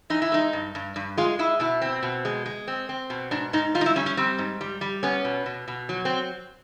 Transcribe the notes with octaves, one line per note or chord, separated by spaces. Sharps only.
E3 D#4
E4
G#3 D#4
G2
G2
G2
G#3 F4
G#3 E4
B2 E4
C4
B2
G#3
G#3
C4
C4
B2
G#2 D4
G#2 D#4
G3 F4
D#4
E4
G3 C#4
C#4
G3 C4
G#2
G3
G3
B3 C#4
B2
B2
B2
F#3
C4